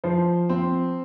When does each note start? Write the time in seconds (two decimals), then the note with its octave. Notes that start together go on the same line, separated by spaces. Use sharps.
0.04 F3 C5
0.49 C4